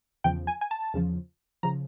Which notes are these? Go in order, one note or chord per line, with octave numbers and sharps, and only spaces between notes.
E2 C#3 F3 G5
G#5
G#5
A5
E2 C#3 F3
C#3 F3 A#5